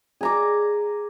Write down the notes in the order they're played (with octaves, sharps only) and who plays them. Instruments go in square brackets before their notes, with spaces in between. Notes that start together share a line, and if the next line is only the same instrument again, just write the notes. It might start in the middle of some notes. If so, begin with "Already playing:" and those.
[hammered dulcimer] G#4 A#5 D6